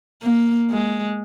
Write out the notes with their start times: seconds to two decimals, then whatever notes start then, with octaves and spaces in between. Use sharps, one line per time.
0.23 A#3
0.71 G#3